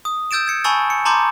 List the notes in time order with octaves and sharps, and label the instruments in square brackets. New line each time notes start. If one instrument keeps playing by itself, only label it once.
[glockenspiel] D#6
E6 G6 A6 D7 E7
E6 G#6 C#7
G#5 A5 B5 C#6 E6 A6
C#7
A5 A#5 C6 D6 G6 A6